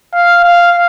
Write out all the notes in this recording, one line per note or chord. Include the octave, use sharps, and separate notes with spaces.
F5
F5